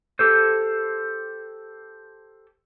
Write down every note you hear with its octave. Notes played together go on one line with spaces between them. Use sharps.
G4 A4 C5